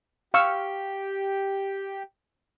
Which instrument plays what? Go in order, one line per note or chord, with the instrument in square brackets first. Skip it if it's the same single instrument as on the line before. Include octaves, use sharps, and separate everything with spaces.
[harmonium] G4 [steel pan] F5 C#6 E6